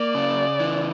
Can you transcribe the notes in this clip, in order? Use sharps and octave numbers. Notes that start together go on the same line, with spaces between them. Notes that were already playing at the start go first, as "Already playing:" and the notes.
Already playing: A#3 D5
C#3
E3